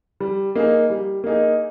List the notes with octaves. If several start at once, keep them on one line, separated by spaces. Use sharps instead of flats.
G3
A#3 D#4 G#4
G3
A#3 D#4 G#4